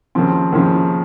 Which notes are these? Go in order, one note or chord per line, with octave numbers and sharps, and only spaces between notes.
D#2 C#3 F3 C4
D#2 C#3 F3 C4